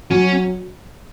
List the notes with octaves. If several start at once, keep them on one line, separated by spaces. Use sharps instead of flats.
F#3 C#4